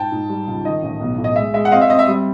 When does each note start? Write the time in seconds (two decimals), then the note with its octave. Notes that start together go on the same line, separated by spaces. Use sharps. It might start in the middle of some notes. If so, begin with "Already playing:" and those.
Already playing: G#2 G5 A5
0.12 G#2
0.29 G3
0.47 C#2
0.65 D#3 D#5
0.83 A1
1.00 B1
1.18 A2
1.24 D#5
1.36 G#3 E5
1.54 G#3 E5
1.65 F#5
1.72 C4 D#5 F5
1.81 E5
1.90 C4 D#5
1.99 E5
2.08 G3